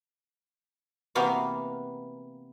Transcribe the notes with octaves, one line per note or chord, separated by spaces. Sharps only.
C3 E3 A#3 B3 F#4 F5